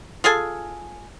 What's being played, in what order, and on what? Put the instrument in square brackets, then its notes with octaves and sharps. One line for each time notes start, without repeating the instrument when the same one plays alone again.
[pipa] F4 G#4 A4 G#5